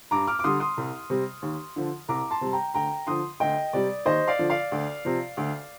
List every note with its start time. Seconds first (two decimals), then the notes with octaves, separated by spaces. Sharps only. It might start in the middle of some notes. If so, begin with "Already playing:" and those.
0.11 G2 A#5 D6
0.27 D6 F6
0.39 D6
0.44 D3 G3 C6 D#6
0.60 C6 D#6
0.77 C2
1.10 C3 G3
1.42 D#2
1.76 D3 F3
2.08 C2 A#5 D6
2.31 A5 C6
2.41 C3 G3
2.53 G5 A#5
2.74 D2 G5 A#5
3.07 D3 F3 C6 D#6
3.40 D2 D#5 G5
3.73 C3 G3 D5
4.06 D#2 C5 D#5
4.28 D5 F5
4.39 D3 F3
4.50 D5 F5
4.72 D2
5.05 C3 F3
5.37 D2